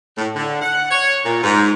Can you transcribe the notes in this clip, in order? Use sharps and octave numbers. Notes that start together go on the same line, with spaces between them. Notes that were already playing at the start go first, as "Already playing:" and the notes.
A2
D3
F#5
C#5
A#2
G#2